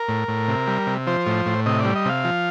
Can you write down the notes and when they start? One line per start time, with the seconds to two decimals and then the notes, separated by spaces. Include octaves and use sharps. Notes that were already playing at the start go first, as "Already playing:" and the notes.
Already playing: A#4
0.08 A2
0.28 A2
0.48 C3
0.67 G3
0.87 C3
1.07 F3 C5
1.27 A2
1.46 A2
1.66 C3 D#5
1.80 G3 D5
1.96 D#5
2.06 C3 F5
2.25 F3